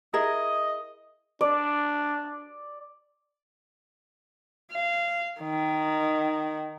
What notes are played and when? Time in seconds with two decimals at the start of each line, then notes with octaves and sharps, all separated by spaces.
0.14 E4 G#4 A#4 D#5
1.41 D4 D5
4.72 F5
5.41 D#3